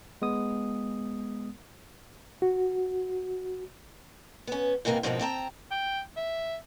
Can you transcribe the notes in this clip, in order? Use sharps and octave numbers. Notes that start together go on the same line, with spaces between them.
G#3 B3 D#6
F#4
B3 C#4
G#2 C3 D#3 A#3 B3
G#2 B2 F3 G3 A#3 C4
C4 G5 A5 A#5
G5
E5